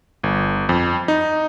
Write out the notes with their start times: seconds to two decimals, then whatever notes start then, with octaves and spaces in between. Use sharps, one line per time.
0.23 G1
0.69 F2
1.08 D#4